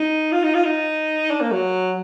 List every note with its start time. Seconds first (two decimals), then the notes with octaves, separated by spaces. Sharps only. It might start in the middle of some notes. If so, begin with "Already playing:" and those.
Already playing: D#4
0.32 F4
0.44 D#4
0.55 F4
0.65 D#4
1.31 D4
1.41 A#3
1.52 F#3